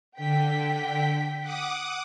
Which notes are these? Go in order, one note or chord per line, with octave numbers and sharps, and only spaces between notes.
D3 G5 B6
F#5 D6 D#6